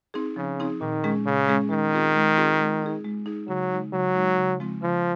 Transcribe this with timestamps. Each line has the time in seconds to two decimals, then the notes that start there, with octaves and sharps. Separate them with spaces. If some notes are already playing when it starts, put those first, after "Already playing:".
0.14 C4 D#4 G#4
0.36 C#3 F3
0.60 C4 D#4 G#4
0.81 A#2 D#3
1.04 G#3 C#4 G#4
1.26 A#2 C#3
1.48 G#3 C#4 G#4
1.70 D#3 G#3
1.93 C4 F4 G#4
2.15 G#3
2.37 C4 F4 G#4
2.60 G#3
2.82 D#4 G#4
3.04 G#3
3.26 D#4 G#4
3.48 C#3 F#3
3.71 G#3 D#4
3.93 C#3 F#3
4.15 G#3 D#4
4.37 C#3
4.60 F3 G#3 C4 F4
4.82 C#3 F3